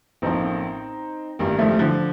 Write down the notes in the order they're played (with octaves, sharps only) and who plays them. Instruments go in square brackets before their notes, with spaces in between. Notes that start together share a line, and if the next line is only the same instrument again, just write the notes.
[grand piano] A1 A2 F3 A#3 [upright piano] C4 D#4
[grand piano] A1 G2 D#3 [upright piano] G3 A#3
[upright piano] F3 A3
G3
D3 F3